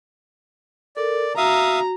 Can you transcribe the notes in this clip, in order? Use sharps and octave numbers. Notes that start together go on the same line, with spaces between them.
A4 A#4 D5
F#4 E5 F5 A#5 D#6